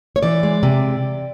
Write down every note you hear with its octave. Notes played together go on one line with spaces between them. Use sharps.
C#5
E3 D5
G#3
C3